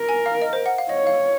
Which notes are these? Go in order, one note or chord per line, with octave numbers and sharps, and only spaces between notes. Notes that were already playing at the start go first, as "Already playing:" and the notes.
Already playing: A#4
G#5
F5
D#5
C5
F#5
F5
C#5 D#5
F5